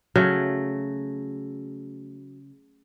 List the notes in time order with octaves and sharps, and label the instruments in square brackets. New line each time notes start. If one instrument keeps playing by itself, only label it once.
[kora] C#3 F#3 A3